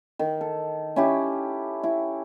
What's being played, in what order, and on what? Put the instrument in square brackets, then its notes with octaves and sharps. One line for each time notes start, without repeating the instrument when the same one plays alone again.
[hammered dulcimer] D#3
A4
C#4 E4 G4
E4